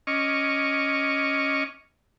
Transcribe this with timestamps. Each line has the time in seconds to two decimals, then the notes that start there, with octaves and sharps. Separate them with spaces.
0.07 C#4 D#5 C#6 D6 F6